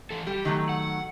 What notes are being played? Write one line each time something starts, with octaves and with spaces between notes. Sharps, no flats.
A2 E3 A4
G3 G4
D#3 F#3 A3
F#5